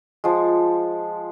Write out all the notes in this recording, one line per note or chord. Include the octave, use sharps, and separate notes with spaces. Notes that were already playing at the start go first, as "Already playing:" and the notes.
F3 G#3